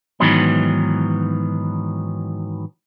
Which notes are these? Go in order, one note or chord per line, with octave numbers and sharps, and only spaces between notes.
G#2 D#3 E3 F#3 B3